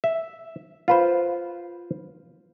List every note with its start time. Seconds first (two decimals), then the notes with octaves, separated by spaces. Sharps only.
0.04 E5
0.88 F4 B4 C5